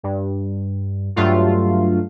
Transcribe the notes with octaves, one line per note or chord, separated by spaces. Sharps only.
G2
G2 F#3 A3 F4